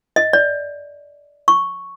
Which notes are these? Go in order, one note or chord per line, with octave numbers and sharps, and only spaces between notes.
D#5
D5
C#6